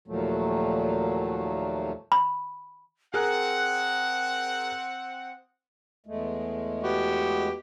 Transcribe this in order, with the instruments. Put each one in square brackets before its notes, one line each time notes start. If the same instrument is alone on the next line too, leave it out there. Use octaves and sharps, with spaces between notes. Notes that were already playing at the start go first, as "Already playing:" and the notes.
[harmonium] D#2 A#2 F3 F#3 A3
[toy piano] B5
[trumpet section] C4 F#5 [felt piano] G#4 A#4 [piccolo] F#6
[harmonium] E2 G#3 A3
[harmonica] B3 F#4 G4